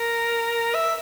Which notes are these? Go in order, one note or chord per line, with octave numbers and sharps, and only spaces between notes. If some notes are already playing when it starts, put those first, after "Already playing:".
Already playing: A#4
E5